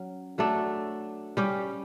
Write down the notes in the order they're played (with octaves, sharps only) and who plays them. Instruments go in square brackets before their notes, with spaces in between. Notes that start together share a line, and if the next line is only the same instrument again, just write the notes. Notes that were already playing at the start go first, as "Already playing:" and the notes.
Already playing: [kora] F#3 C#4
F#3 A3 D4 A4
G3 C#4 G4